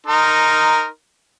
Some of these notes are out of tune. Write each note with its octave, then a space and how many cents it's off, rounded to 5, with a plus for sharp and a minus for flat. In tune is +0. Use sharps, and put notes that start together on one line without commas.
D#4 +0 A#4 -5 C6 +0